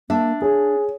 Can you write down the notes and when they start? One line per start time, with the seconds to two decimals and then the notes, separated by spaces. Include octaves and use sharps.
0.10 A#3 D4 E5
0.42 G#4 C#5